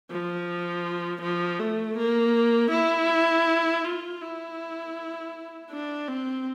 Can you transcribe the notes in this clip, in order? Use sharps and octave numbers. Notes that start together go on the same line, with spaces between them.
F3
F3
A3
A#3
E4
F4
E4
D4
C4